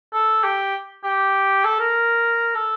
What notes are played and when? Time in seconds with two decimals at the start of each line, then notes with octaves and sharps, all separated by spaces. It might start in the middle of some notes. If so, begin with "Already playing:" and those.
0.13 A4
0.43 G4
1.04 G4
1.65 A4
1.80 A#4
2.55 A4